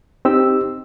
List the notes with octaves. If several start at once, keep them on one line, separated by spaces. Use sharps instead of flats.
C4 D#4 G4 E6